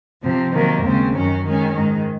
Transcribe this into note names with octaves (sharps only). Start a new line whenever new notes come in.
C3 F3 C4
C3 D#3 F#3 A#3
D#2 C#3 G#3 C4
F#2 D#3 F#3 C#4
D#3 G#3 C#4
G#2 D#3 G#3